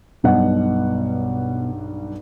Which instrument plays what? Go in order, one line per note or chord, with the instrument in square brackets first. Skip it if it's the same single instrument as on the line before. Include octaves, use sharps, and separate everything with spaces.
[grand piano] B1 G2 F#5 [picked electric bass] B2